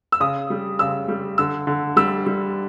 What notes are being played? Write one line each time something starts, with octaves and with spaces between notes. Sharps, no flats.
E6
C#3 D#6
G3
C#3 E6
G3
D3 E6
D3
G3 E6
G3